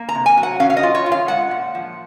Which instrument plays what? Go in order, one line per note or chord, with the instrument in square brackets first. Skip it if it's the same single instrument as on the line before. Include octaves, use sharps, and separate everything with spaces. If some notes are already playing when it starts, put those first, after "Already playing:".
Already playing: [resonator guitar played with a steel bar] A#3
A#5
C3
G#5
F#3
F#5
C#4 F5
F5
D#5
F4
C#5
F4
F5
G#3 F#5
A#2
F3